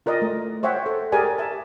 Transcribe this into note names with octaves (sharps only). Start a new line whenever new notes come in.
F4 A#4 D5 D#5
A3
C5 C#5 E5 F#5 G5
A4
G4 G#4 A#4 D5 G#5
E5 A5